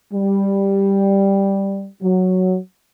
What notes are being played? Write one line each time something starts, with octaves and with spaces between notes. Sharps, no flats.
G3
F#3